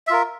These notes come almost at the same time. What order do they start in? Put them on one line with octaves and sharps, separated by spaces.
E5 F4 A#4